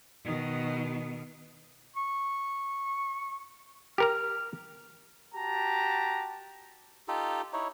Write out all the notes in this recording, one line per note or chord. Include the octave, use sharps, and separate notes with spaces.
B2 D#3
C#6
G4 A#4 A#5 F6
F#4 G4 A5 A#5
D#4 F4 G4 A4
D#4 E4 C#5